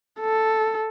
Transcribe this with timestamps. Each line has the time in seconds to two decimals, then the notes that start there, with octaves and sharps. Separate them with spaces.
0.20 A4